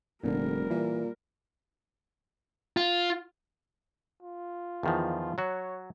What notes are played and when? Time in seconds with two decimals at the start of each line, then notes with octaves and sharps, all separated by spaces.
0.24 F1 A#2 D3 G3 A#4
0.70 A#2 E3
2.77 F4
4.22 F4
4.83 E2 D#3 F3
5.38 F#3 F#4 C#5